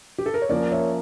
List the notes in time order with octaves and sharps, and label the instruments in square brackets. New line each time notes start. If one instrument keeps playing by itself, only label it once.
[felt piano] G4
A4
A#4
C#5
[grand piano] F3 A#3 C#4 [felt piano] A#4 D5
[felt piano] C#5 E5